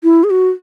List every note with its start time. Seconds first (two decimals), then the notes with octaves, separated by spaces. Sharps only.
0.03 E4
0.24 G#4
0.30 F#4